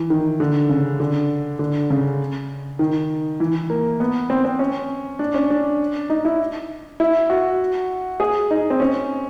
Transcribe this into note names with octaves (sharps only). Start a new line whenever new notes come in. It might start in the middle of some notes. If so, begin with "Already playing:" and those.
Already playing: E3
D#3
D3
C#3
D3
D3
C#3
D#3
E3
A#3
B3
C4
C4
C#4
D4
C#4
D4
D#4
E4
E4
F#4
G#4
D#4
C4
C#4